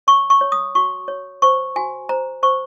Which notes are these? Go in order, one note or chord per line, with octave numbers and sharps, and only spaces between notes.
C#5 C#6
C#6
C#5
D#6
F#4 C#6
C#5
C5 C#6
F#4 G#5
C5 A#5
C5 C#6